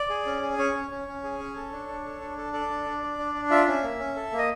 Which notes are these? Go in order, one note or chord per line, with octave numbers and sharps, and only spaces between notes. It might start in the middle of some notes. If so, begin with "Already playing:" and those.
Already playing: D5
G#4
C#4
G#4
C#4 C#5
C#4
C#4
C#4
G#4
C#4
A4
D4
D4
A4
D4
A4
A4 D5
D4
D4
D4
D4
D4
F4 E5
C#4
A#3
C#4
A4
A#3
D#5